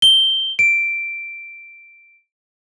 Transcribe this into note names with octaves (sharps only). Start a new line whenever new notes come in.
G7
D7